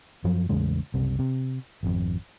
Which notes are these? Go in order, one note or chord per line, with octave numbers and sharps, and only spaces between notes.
F#2 F3 F#3
A1 E2 C#3 G#3
F#1 C2 C3
C3
G#1 F2